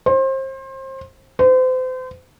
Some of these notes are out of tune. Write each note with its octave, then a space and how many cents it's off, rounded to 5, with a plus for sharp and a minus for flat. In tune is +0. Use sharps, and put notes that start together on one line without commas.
C5 +30
C5 -35